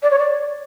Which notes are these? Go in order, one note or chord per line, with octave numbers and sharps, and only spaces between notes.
D5
C#5
D5